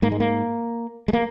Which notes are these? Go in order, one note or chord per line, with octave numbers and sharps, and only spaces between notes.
G#2 A#3
G#3
A#3
G#3
A#3